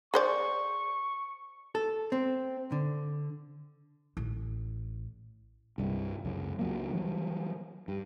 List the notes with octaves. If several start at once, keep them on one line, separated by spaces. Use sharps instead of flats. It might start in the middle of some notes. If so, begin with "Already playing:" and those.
G#4 C5 D5 C#6
A4
C4
D3
A1
C2 G2 C3
C#2 F#2
C#2 F#3 A#3
E3 F#3 G3
G2